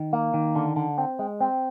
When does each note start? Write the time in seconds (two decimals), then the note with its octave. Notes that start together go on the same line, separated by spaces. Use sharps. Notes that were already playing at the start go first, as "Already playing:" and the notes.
Already playing: D#3
0.13 A#3
0.34 D#3
0.56 D3
0.76 D3
0.98 C4
1.19 G#3
1.41 C4